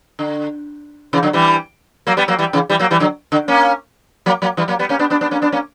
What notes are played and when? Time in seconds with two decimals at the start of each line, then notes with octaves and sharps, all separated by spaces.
0.19 D3
1.13 C#3 E3
1.23 D3 F#3
1.33 E3 G3
2.07 F#3 A#3
2.17 G3 B3
2.28 F#3 A#3
2.39 E3 G3
2.53 C#3 E3
2.69 E3 G3
2.79 F#3 A#3
2.91 E3 G3
3.00 D3 F#3
3.32 D3
3.48 A#3 C#4
4.26 F#3 A#3
4.42 F#3 A#3
4.57 E3 G3
4.68 F#3 A#3
4.79 G3 B3
4.89 A#3 C#4
4.99 B3 D4
5.10 B3 D4
5.21 B3 D4
5.31 A#3 C#4
5.42 B3 D4
5.52 A#3 C#4